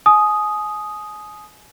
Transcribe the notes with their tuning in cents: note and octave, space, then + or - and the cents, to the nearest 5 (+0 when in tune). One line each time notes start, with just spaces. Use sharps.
G#5 +30 D#6 +0